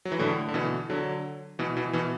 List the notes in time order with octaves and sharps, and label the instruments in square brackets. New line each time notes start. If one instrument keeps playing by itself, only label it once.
[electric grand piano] F#3
E3
A2 D3
D3
B2 E3
D3 F#3
B2 E3
B2 E3
B2 E3